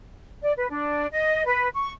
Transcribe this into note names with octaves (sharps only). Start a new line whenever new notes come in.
D5
B4
D4
D#5
B4
C#6